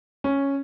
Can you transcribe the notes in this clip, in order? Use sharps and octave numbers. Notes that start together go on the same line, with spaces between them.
C#4